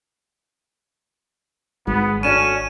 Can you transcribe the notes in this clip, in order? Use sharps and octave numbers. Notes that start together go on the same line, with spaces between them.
G#1 G#3 B3
A3 C#4 D4 F#4 D#7 E7